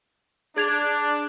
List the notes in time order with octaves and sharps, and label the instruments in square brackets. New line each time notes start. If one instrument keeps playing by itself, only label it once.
[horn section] D4 [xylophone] G#4 G#6 F7